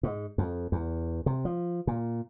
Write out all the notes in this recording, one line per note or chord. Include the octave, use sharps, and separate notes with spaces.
G#2
F2
E2
C3
F3
A#2